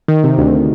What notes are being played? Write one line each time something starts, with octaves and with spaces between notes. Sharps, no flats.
D#3
C3
D2